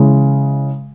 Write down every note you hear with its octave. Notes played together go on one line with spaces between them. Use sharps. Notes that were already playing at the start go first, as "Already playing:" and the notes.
Already playing: C#3 E3 G#3